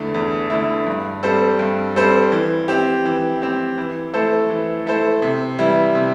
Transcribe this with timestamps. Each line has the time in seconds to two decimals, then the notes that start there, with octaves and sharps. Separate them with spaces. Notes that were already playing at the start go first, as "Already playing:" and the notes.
Already playing: E2 D3 A3 E4
0.14 E2
0.50 D3 A3 E4
0.87 G2
1.23 G3 C4 A4 C5
1.59 G2
1.96 G3 C4 A4 C5
2.32 E3
2.68 C4 G4
3.05 E3
3.42 C4 G4
3.78 E3
4.14 A3 E4 A4 C5
4.50 E3
4.86 A3 E4 A4 C5
5.22 C3
5.59 E3 G3 E4
5.95 C3